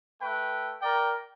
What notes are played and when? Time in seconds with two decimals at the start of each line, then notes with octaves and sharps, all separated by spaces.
0.21 A3 B4 G5
0.82 A#4 D5 G5